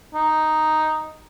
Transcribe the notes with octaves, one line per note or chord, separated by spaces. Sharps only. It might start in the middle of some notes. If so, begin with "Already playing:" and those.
D#4